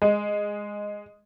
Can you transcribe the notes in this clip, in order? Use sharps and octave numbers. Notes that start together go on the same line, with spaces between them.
G#3